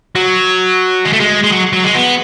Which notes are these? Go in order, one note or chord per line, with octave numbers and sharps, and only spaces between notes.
F#3
G#3
A3
G#3
G#3
F#3
F#3
G#3
B3